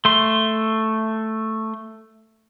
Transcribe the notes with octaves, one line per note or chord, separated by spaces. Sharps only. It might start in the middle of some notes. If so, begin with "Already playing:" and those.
A3 C6